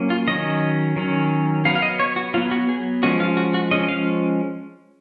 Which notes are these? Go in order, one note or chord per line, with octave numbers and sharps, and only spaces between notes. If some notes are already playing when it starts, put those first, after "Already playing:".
Already playing: F#3 A#3 C#4
F4
D#3 F#3 C#4 D#5
D#3 F#3 C#4
F#3 B3 F5
F5
D#5
C#5
F#4
F#3 B3 F4
F#4
G#4
F3 G#3 C#4 F#4
F4
F#4
F#4
F3 G#3 C#4 D#5
F5